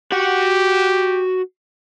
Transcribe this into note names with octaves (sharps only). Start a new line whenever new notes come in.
F#4 G4 F#5